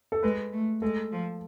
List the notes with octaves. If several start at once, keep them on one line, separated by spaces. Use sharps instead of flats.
A4
G#3 B4
A3
G#3 A4
F3